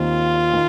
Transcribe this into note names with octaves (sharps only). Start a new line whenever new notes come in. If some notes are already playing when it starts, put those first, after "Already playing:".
Already playing: D#2 D#3 C4 F4
D#3